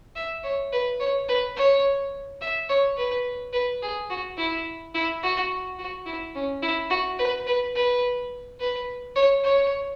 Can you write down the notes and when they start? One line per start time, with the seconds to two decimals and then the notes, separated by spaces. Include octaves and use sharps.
0.16 E5
0.44 C#5
0.72 B4
1.00 C#5
1.28 B4
1.56 C#5
2.41 E5
2.69 C#5
2.97 B4
3.53 B4
3.82 G#4
4.10 F#4
4.38 E4
4.95 E4
5.23 F#4
5.79 F#4
6.06 E4
6.35 C#4
6.63 E4
6.90 F#4
7.19 B4
7.47 B4
7.76 B4
8.60 B4
9.16 C#5
9.44 C#5